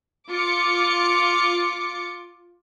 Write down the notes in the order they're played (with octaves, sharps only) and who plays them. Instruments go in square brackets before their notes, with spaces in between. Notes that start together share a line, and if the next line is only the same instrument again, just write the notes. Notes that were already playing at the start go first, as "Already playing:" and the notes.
[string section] F4 D6 C#7